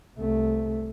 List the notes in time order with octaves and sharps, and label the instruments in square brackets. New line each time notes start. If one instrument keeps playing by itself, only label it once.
[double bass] C2 A3